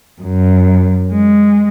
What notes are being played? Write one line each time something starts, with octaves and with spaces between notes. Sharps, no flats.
F#2
G#3